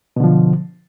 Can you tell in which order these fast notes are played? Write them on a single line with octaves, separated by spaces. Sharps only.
B2 D3 F3